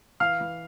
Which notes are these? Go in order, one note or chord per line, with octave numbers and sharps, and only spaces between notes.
E3 F5 F6
E3